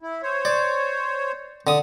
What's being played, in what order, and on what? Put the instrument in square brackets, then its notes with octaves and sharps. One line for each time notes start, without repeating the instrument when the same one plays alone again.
[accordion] E4
C5 C#5
[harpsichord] D5
D3 D#6